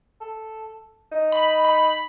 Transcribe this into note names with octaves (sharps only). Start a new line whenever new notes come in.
A4
D#4
B5
B5